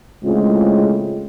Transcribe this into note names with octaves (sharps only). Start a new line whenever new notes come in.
A2 C#3 G#3 C4 F4